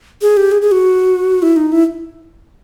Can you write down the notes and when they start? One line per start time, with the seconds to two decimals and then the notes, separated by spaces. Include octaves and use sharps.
0.22 G#4
0.37 G4
0.52 G#4
0.62 G#4
0.72 F#4
1.42 E4
1.56 D#4
1.72 E4